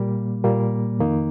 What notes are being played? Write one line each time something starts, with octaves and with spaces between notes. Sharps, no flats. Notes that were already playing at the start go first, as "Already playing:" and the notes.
Already playing: A#2 G3 A#3
A#2 G3 A#3
F2 D#3 A#3 D#4